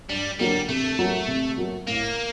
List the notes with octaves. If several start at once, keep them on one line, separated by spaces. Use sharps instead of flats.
G2 G3
D3 F#3 G3 A#3
C3 A3
F#3 A#3 F#4
C3
F#3 A#3 F#4
A2 A#3